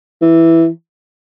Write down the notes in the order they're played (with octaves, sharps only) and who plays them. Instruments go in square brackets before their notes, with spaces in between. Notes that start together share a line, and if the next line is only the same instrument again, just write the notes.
[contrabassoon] E3